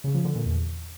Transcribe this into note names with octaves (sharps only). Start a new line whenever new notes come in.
C#3
F3
D3
A#2
E2